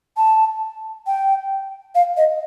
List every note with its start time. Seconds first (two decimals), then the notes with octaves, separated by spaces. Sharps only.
0.17 A5
1.07 G5
1.95 F5
2.17 D#5